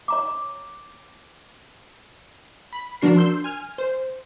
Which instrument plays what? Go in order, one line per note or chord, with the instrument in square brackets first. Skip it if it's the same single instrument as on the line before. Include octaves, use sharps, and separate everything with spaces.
[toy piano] C#5 A#5 D6
[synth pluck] B5
F3 D4 F#4 A#4 C7
C6 E6 G6
G#5 F6
C5